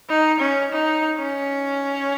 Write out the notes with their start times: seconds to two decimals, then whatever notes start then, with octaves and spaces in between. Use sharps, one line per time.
0.09 D#4
0.40 C#4
0.72 D#4
1.19 C#4